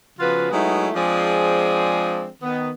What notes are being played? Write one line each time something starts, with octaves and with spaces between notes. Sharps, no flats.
C#3 F3 B3 F4 F#4 B4
F#3 G#3 A3 B3 D#4 E4
F3 G#3 C4 D4 G#4 D5
D#3 B3